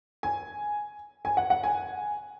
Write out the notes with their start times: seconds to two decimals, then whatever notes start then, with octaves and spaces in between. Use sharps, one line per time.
0.23 G#5
1.25 G#5
1.37 F#5
1.50 F#5
1.64 G#5